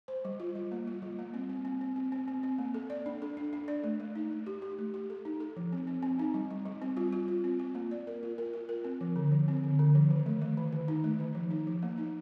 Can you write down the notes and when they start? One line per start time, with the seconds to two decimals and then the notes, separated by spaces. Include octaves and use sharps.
0.08 C5
0.25 G3
0.40 F4
0.55 G3
0.71 A#3
0.87 F4
1.02 G3
1.19 A#3
1.34 C4
1.50 C4
1.65 C4
1.81 C4
1.96 C4
2.12 C4
2.28 C4
2.43 C4
2.58 A#3
2.74 A4
2.90 D5
3.06 D4
3.22 A4
3.37 D4
3.53 D4
3.68 D5
3.84 A3
4.00 A3
4.16 D#4
4.31 A3
4.46 G4
4.62 G4
4.78 A3
4.94 G4
5.10 A4
5.25 D#4
5.40 A4
5.56 F3
5.72 C4
5.87 C4
6.03 C4
6.19 D#4
6.34 G3
6.51 G3
6.65 G3
6.82 C4
6.97 F4
7.12 F4
7.28 F4
7.44 C4
7.59 F4
7.75 A#3
7.91 D5
8.07 A#4
8.23 F4
8.38 A#4
8.53 F4
8.69 A#4
8.84 C4
9.01 F3
9.16 D3
9.32 F3
9.48 C4
9.64 D3
9.79 D3
9.95 F3
10.10 D#3
10.26 A3
10.42 A3
10.57 D#3
10.73 D#3
10.88 D#4
11.04 A3
11.20 D#3
11.35 F3
11.51 D#4
11.67 F3
11.82 A#3
11.98 D#4